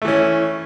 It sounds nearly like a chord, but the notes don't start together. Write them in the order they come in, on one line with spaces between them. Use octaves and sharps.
A3 E3 C#4